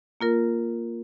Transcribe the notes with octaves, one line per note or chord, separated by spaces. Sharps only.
A#3 F4 A#4